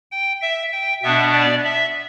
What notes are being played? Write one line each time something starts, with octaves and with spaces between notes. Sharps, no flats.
G5
E5
G5
B2 B3 D4 E5
D5
E5